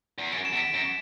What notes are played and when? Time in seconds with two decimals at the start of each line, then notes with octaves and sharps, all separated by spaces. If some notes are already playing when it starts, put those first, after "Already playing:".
0.18 E2
0.32 F#2 D7
0.45 E7
0.53 E2
0.57 B6 D7
0.74 F#2